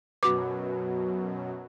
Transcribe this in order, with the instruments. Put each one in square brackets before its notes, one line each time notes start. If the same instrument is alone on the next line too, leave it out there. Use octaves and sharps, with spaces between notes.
[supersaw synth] F#2 B2 F#3 [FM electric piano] F#4 B4 [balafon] D6